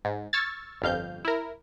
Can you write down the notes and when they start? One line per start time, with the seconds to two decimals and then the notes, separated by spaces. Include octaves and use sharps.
0.05 G#2
0.33 C#6 E6 F6 G#6 A6
0.82 G1 F2 F5 G6
1.25 E4 A#4